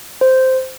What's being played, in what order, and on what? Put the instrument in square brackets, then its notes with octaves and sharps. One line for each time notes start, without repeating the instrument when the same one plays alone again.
[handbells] C5